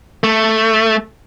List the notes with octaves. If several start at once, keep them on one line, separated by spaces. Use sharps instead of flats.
A3